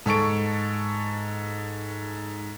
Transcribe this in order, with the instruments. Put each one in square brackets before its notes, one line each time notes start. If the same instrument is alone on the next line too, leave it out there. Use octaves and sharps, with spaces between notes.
[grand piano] G#2 A4 C#6 D7